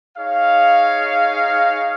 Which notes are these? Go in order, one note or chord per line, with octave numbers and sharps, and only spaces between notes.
D#4 G#4 C#5 F5